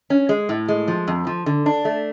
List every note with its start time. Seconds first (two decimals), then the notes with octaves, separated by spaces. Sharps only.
0.10 C#4
0.29 G#3
0.49 A2
0.68 G#3
0.88 F3
1.07 F2
1.27 F3
1.46 D3
1.66 D4
1.85 A3